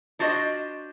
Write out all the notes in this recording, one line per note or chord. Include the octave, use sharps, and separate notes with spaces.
D4 F4 F#4 C5 D5 D#5